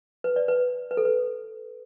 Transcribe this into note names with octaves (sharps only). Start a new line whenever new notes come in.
B4
D5
B4
B4
A4
B4